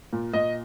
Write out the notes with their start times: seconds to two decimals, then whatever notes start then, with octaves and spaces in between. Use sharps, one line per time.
0.13 A#2
0.33 A#2 D#5